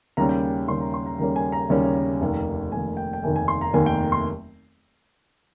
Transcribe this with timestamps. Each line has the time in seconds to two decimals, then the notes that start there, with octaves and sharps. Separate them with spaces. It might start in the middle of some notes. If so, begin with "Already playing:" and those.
0.17 D#2 C#3 G3 A#3 C#4 A#5
0.29 G5
0.67 D#2 C#3 G3 A#3 C#4 C6
0.81 A#5
0.94 C6
1.06 A#5
1.19 D#2 C#3 G3 A#3 C#4 A#5
1.36 G#5
1.52 A#5
1.70 D#2 C#3 G3 A#3 C#4
2.21 F1 D#2 D#3 A#3
2.72 F1 D#2 D#3 A#3 G#5
2.97 G5
3.13 G5
3.23 F1 D#2 D#3 A#3 G#5
3.36 G#5
3.48 C6
3.61 A#5
3.73 F1 D#2 D#3 A#3 G#5
3.86 G5
4.12 C6